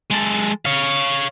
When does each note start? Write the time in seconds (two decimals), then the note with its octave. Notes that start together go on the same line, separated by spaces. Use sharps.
0.11 G#3 A4
0.65 C#5 F5